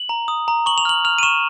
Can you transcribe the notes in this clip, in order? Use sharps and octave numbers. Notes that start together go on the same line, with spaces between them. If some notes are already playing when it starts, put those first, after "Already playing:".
Already playing: F#7
A#5
D#6
A#5
C#6 F#7
F7
F6 F#7
F6 F7
D#7
C#6 E7